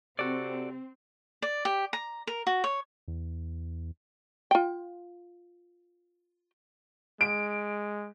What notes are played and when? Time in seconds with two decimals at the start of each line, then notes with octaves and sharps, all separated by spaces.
0.19 C3 C4 F#4 A4 D5
1.42 D5
1.65 G4
1.93 A#5
2.27 A#4
2.47 F#4
2.64 C#5
3.08 E2
4.51 F4 G5
7.21 G#3 D7